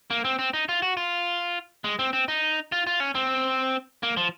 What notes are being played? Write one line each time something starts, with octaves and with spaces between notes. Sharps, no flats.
A#3
C4
C4
D#4
F4
F#4
F4
G#3
C4
C4
D#4
F4
F4
C#4
C4
A#3
F3